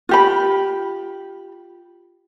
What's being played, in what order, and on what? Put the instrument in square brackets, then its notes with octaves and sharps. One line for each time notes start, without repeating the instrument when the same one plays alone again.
[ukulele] F4 G4 B5